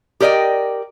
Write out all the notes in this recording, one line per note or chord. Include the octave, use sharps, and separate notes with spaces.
G4 A#4 D5 D#5 G5